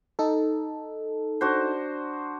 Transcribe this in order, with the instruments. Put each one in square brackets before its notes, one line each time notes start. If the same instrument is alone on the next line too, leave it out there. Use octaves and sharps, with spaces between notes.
[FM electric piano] D#4 A4
[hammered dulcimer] D4 F#4 C5